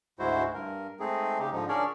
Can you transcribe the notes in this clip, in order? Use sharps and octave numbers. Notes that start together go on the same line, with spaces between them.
D2 G#2 G#3 E4 F#4 C5
G2 A#4
G#3 A3 C4 D#4 G#4
C#3 D#4 G4
G#2 D3 F3 D#4
C#4 D4 G#4 A#4 C#5 D5